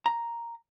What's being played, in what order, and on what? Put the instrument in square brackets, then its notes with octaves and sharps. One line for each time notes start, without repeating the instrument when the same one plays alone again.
[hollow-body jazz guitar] A#5